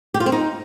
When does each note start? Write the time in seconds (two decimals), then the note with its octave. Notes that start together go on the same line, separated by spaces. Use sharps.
0.14 G4
0.20 F4
0.26 C4
0.32 D#4